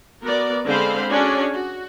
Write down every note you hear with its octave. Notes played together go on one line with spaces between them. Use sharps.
B3 F#4 A#4 D5
D3 G#3 C4 C5 F5 B5
C#4 D4 F#4 G#4 C#5 D5
F#4